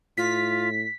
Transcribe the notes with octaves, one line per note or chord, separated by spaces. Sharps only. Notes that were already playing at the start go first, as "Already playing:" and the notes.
A2 F4 B6